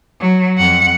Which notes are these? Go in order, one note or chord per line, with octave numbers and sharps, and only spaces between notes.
F#3
F2 F#5